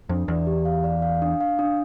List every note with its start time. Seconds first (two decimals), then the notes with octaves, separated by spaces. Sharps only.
0.09 F2 D4
0.28 E2 D5
0.47 G4
0.65 F5
0.84 D5
1.02 F5
1.22 D4
1.41 F5
1.59 D4